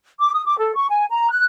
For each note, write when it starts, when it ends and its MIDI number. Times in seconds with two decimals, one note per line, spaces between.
0.19 0.34 86
0.34 0.45 87
0.46 0.57 86
0.59 0.73 69
0.75 0.87 85
0.89 1.05 80
1.10 1.30 82
1.30 1.44 90